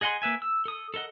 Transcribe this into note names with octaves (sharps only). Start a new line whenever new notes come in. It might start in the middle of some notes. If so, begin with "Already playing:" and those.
G#4 D#5 F#5 G#5 C6
A#3 B4 E5 G#5
E6
A4 D#6
A4 A#4 D#5 F#5